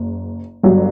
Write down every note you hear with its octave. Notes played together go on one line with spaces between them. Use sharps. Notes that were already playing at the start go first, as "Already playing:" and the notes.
Already playing: F#1
G1 G2 F#3